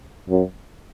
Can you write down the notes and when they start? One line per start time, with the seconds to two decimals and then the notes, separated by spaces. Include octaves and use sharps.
0.29 F#2